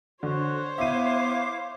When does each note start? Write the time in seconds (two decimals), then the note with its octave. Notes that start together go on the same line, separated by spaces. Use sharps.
0.23 D3 F#4 C5 C#5
0.78 B3 E4 E5 F5 D6 D#7